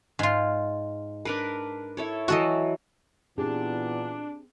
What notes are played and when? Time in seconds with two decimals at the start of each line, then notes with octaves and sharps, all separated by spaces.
0.19 G#2 F4
1.25 D4 A#4 B4
1.97 E4 A4 C#5
2.28 E3 F#3 F#4 A4 D#5
3.38 A#2 E3 B3 C4 D4 G4 G#4